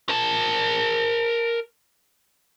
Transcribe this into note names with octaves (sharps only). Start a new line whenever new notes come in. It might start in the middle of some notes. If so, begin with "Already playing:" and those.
A#4 A5